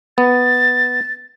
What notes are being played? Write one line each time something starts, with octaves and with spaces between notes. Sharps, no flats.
B3 A6